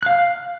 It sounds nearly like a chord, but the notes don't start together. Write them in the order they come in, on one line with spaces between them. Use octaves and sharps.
F#6 F5 F6